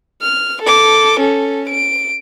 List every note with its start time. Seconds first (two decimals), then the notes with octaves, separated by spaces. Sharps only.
0.22 F6
0.62 A4 D6
1.19 C#4 A4
1.69 D7